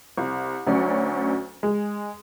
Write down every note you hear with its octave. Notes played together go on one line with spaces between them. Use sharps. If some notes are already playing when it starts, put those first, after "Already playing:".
C2
D2 F#3 C#4 D5
G#3